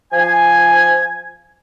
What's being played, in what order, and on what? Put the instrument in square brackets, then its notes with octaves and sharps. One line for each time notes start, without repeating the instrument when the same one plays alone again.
[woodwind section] F3 G#5